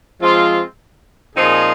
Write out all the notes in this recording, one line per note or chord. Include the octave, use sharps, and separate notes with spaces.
F3 G#3 C4 F4
A#2 F3 C4 D#4 G#4